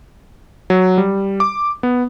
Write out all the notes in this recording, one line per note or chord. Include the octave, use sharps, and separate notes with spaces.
F#3
G3
D6
B3